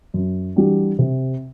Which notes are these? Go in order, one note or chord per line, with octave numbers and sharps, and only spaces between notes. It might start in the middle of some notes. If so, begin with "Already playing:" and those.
F#2
E3 G3 D4 F#4
C3